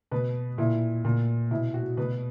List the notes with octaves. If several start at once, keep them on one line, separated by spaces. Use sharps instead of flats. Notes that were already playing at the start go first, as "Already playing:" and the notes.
B2 B4
A#2 E4
A#2
B2 E4
F#4
B2 B4